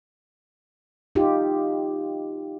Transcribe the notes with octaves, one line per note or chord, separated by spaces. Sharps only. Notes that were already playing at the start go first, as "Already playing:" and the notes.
D#4 F4 G4